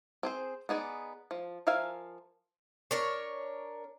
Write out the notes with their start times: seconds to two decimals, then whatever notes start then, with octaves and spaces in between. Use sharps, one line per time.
0.23 C4 G#4 C5
0.69 B3 D#4 G#4 D5
1.31 F3
1.67 F3 A#4 E5 F5 G#5
2.91 D4 A#4 C#5